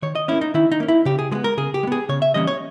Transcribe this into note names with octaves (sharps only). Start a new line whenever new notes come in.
D#3 C#5
D#5
A#3 C#4 E4
D#4
D#3 E4
D#4
A#3 C#4
E4
C#3 G4
G#4
G#3 B3 G#4
A#4
C#3 G#4
G4
G#3
B3 G#4
C#3 C#5
E5
E3 G3 A#3 C#4 D#5
C#5